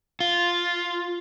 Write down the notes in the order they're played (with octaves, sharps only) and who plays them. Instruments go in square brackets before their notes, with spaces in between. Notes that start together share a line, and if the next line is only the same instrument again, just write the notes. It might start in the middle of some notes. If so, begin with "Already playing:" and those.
[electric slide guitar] F4